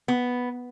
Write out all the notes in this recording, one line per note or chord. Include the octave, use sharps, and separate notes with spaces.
B3